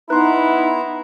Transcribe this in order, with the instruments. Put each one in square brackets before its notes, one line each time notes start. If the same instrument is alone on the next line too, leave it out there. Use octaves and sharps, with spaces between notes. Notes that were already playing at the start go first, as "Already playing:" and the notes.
[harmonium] B3 A#5 [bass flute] D#4 [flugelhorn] E4 [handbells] B4 C6